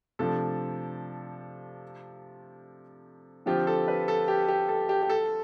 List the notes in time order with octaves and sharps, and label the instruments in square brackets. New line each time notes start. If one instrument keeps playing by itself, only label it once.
[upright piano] C3 F3 A3 D4 [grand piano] A4
[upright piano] D3 F3 C4 F4 [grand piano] G4
[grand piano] A4
B4
A4
G4
G4
A4
G4
G4
A4